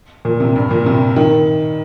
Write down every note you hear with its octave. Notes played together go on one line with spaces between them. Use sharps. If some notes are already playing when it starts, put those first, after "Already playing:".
A#2
C3
G2
A#2
C3
D#3